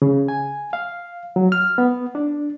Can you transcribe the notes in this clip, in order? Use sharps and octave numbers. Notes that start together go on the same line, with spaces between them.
C#3
G#5
F5
F#3
F6
B3
D4